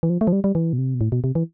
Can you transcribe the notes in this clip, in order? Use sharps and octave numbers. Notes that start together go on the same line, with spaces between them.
E3
F3
A3
F3
G3
G3
E3
B2
C3
B2
A2
B2
C3
E3